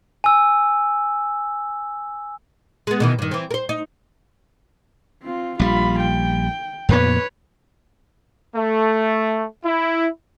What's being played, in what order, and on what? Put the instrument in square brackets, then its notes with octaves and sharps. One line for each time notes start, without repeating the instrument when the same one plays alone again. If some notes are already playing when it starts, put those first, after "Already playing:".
[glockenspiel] G#5 E6
[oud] G#3 B3
B2 D#3 E3
G2 D#3
E3 C4
A#4 C5
D#4
[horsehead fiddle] C4 F4
[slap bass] A#1 G3 [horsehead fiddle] F4 B5
[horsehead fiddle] G5
[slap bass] F2 A#2 B3 [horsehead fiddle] B4 C#5
[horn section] A3
E4